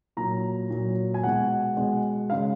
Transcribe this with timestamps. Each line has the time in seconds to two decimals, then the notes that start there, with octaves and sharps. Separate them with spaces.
0.17 A#2 F#3 A#5
0.70 A#2 F#3
1.14 G#5
1.23 B2 G#3 F#5
1.77 B2 G#3
2.30 C#3 G#3 F5